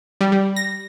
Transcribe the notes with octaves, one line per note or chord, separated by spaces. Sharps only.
G3
G3
A#6